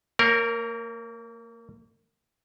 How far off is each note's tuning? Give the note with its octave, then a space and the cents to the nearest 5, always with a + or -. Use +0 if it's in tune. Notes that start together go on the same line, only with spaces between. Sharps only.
A#3 -35 A#4 +0 C#5 +0